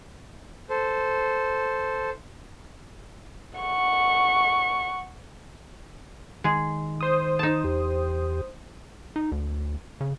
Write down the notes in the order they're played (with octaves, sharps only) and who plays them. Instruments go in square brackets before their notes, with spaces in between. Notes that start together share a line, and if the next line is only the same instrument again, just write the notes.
[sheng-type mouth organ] A4 C5
[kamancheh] F#5 C#6
[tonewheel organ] D#3 [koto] G#3 G#4
[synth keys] C5 D#6
[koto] D#4 A5
[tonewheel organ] E2 G4
[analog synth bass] D#4
D2
C#3